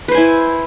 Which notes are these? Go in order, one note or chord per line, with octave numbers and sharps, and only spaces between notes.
E4 B4 C5 G#5